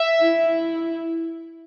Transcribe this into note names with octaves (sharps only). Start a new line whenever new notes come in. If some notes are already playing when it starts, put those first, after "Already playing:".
Already playing: E5
E4